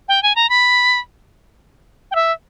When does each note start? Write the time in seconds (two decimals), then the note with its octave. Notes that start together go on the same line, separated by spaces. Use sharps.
0.09 G5
0.23 G#5
0.36 A#5
0.49 B5
2.11 G5
2.15 E5